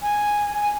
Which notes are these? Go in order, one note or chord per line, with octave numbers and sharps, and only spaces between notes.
G#5